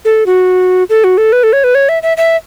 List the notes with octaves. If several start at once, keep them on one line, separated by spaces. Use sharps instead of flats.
A4
F#4
A4
F#4
A4
B4
A4
C#5
B4
C#5
E5
E5
E5